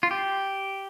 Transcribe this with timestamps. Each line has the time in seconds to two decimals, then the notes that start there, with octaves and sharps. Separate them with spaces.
0.03 F4
0.11 G4